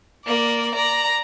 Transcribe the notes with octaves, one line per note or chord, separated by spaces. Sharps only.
A#3 D5
D5 A#5